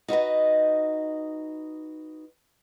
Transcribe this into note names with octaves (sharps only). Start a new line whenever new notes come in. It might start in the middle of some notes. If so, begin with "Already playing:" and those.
D#4 F#4 B4 D#5